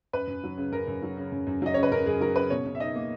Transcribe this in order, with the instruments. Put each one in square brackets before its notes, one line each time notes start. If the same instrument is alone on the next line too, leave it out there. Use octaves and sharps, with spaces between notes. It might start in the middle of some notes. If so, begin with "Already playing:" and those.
[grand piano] F#2 B4
F#2
F#3
C#3
F#2 A#4
F#2
F#3
C#3
F#2
F#2
F#3 D#5
C#3 C#5
B4
F#2 A#4
F#2 G#4
F#3 A#4
C#3 B4
B2 C#5
B2
E5
D#4 D#5
A#3